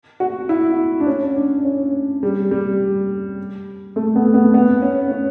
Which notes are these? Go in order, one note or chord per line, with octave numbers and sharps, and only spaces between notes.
F#4
E4
D4
C#4
D4
C#4
G3
G3
A3
B3
B3
B3
C#4
C#4